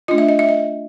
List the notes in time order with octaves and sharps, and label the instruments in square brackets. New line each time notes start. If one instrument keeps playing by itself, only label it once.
[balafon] A3 D4 F4 D#5
E5
D#5
E5
D#5